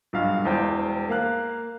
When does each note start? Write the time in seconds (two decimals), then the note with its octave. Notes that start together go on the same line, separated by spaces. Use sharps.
0.13 B1 G2 F5 F6
0.43 E1 E2 C5 G5
1.09 A#3 F5 F#6